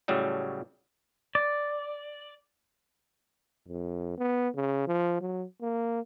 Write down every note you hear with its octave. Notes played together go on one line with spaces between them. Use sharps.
A2 C#3 F#3 G3 A3
D5
F2
B3
C#3
F3
F#3
A#3